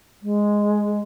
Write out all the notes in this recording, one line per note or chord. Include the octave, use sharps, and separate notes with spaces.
G#3